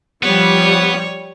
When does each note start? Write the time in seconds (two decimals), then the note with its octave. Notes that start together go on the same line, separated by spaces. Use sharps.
0.23 F3 G3 B3 C#5